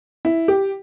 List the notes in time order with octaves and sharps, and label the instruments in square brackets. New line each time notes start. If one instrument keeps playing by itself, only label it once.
[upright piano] E4
G4